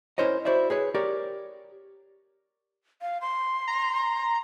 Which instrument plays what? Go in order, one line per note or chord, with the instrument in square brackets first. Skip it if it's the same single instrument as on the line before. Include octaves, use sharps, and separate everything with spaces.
[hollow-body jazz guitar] C#4 E4 A#4 C5 C#5 D#5
E4 F#4 C5 D5 E5
G#4 B4 C#5
G4 A#4 C#5 D5
[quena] F5
C6
[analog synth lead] A#5